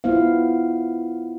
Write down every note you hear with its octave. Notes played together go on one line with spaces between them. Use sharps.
B3 E4 F4 C5 F5